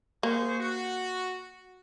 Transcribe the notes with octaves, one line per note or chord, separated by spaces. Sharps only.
A#3 G#4 C5 C#6
F#4